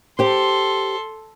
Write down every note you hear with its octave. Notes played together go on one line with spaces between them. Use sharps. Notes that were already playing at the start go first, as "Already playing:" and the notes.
G4 A4 C5 C6